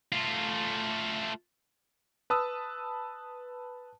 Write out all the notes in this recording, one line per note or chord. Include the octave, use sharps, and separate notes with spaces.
A3 F4
B4 A5 D#6 E6